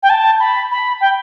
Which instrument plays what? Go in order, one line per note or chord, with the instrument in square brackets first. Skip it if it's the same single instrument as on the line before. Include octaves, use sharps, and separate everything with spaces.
[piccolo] G5
A5
B5
B5
G5